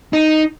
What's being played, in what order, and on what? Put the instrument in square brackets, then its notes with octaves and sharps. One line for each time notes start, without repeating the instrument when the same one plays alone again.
[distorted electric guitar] D#4